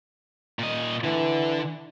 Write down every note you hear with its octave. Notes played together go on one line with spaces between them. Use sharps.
A#2 D#5
D3 E3